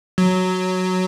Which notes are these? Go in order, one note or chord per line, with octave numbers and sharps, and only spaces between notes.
F#3